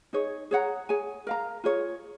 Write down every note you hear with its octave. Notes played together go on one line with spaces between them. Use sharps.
D#4 G#4 C#5
G#4 C#5 F#5 A#5
G#4 C#5 G#5
A#4 F5 A#5
F4 G#4 C#5